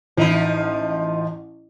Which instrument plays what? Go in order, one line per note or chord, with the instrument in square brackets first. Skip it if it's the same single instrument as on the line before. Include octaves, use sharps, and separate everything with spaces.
[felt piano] A1 [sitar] F3 D#4 E4